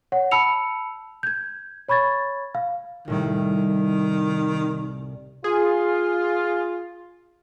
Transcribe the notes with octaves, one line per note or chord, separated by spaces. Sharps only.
C#5 F#5
A5 B5 E6 C#7 F7
G6 G#6
C#5 B5 C#6 G#6 A6
F5
C2 A2 D#3 G3
F4 G#4